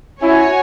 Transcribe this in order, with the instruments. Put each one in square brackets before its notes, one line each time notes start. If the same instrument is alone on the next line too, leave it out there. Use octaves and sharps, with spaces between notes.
[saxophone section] C#4 E4 [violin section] F#4 C#5 G#5